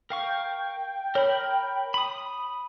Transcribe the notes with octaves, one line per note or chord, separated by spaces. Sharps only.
A#4 F5 G5 C#6
A#4 C#5 B5
B5 D#6